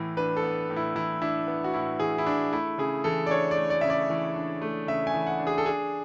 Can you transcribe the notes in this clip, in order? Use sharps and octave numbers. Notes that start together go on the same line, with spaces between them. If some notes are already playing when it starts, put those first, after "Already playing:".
Already playing: A2 E3 B3
D4 B4
A4
B3
A2
E4
E3 E4
D4 E4
B3
F#4
A2 E4
E3 G#4
E4
D4
A3 E4
C#3 G#4
E3 A4
D5
D4 C#5
D5
A3
D5
C#3 E5
D5
E3
D4
A3
C#3 E5
G#5
E3
F#5
D4
G#4
A4
D4 G#4